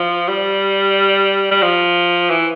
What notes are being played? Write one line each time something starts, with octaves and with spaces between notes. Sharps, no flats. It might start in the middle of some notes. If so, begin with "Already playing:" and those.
Already playing: F3
G3
G3
F3
E3